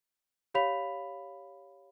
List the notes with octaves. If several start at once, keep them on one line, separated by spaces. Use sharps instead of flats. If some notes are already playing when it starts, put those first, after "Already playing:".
G4 C#5 F5 B5 B6 F7